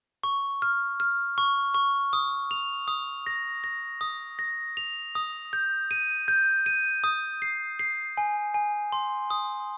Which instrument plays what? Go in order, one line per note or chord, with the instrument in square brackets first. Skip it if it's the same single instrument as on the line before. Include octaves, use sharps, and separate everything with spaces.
[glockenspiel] C#6
F6
F6
C#6
C#6
D#6
F7
D#6
A#6
A#6
D#6
A#6
F7
D#6
G6
D#7
G6
D#7
D#6
C7
C7
G#5
G#5
C6
D#6